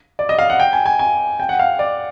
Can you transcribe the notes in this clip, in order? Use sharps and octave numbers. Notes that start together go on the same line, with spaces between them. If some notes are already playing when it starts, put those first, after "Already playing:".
D5
D#5
F5
F#5
G5
G#5
G#5
G#5
G5
F#5
F5
D5